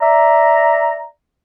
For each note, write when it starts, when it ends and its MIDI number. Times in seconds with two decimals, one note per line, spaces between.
0.01 1.05 74
0.01 1.05 76
0.01 1.05 82